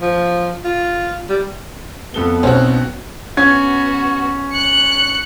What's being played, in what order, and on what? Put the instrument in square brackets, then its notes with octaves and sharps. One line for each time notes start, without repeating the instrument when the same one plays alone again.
[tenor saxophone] F3
F4
G3
[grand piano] F2 A4 G7 [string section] B3
[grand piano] B1 B2 [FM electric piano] C4 [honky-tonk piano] C#4 F#4
[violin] B3 F#4 [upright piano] C#4 G#6
[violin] F#6 C#7